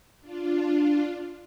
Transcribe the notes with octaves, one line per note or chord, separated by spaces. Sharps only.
D4 F4